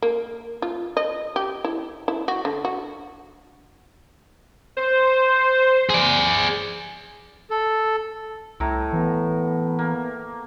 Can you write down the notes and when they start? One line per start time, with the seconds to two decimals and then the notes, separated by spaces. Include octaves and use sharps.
0.02 A#3
0.62 F4
0.97 D#5
1.36 G4
1.64 E4
2.08 E4
2.28 F#4
2.45 D3
2.65 F#4
4.77 C5
5.90 G#4 D5
7.50 A4
8.60 C2 A2 A#5
8.93 E3 B3
9.79 A#3